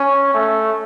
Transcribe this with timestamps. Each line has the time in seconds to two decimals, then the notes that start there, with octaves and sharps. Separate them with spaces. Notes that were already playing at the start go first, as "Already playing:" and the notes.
Already playing: C#4
0.34 A3